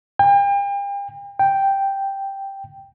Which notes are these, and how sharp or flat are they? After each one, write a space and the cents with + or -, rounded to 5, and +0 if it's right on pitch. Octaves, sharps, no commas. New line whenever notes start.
G5 +40
G5 +0